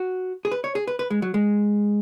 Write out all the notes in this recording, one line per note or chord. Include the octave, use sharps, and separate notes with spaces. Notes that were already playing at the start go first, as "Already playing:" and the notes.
Already playing: F#4
G#4
B4
C#5
G#4
B4
B4
G#3
F#3
G#3